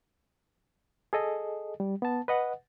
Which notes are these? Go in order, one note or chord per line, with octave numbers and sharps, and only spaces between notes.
G#4 A4 D#5
G3
B3 A5
B4 D#5 F#5